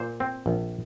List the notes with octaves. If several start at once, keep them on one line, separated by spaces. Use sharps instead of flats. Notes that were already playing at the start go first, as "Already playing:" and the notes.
Already playing: A#2 C5
C4
A#1